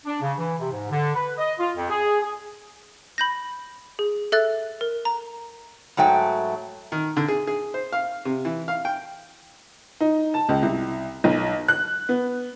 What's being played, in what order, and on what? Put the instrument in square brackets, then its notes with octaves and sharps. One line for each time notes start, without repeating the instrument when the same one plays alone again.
[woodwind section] D4
C#3
E3
C3
G#2
D3
B4
D#5
F4
F2
G#4
G#4
[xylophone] B5 G6 A#6
G#4
A4 E5 F#6 A6
A#4
A#5
[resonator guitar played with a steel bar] G#2 F#3 A3 G5
[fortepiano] D#3
D3
G#4
G#4
C5
F5
C3
E3
F5
G5
[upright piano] D#4
A5
C#2
C2
B1
F#6
B3